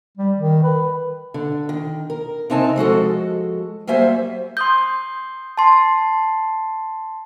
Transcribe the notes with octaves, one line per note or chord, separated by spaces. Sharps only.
G3
D#3
B4
D3
D#3
A#4
C3 C4 D#4 G#5 A5
F3 G#3 F#4 A4
F#3 G3 A#3 C5 E5 G#5
C6 D#6 G6
A5 C6